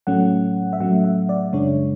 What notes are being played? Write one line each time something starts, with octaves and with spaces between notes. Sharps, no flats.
A2 F#3 A3 C#4 F#5
E5
A2 F#3 A3 C#4 F#5
E5
D5
F#2 C#3 G#3 D4 C#5